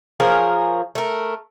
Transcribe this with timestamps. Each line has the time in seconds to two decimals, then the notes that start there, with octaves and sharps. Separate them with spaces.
0.20 F3 G#4 A#4 C#5
0.95 A3 A#4